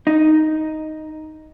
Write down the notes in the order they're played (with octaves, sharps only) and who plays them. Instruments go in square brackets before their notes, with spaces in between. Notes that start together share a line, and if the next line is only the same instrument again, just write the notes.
[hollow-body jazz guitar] D#4